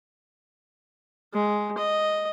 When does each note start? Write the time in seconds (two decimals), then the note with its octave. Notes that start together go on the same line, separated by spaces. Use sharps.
1.33 G#3
1.77 D#5